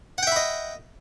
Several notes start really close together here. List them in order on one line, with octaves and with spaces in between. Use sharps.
F#5 G5 E5 B5 D#5